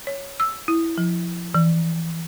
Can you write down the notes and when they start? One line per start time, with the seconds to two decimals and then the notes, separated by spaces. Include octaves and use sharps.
0.07 C#5
0.40 E6
0.68 E4
0.98 F3
1.55 E3